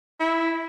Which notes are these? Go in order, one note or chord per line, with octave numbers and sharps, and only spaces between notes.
E4